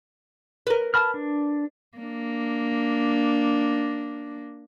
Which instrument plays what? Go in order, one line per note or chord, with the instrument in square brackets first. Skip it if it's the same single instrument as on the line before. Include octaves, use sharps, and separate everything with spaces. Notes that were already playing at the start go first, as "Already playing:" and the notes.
[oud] A#4 B4
[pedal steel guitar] A5 B5 F6
D4
[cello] A#3 D4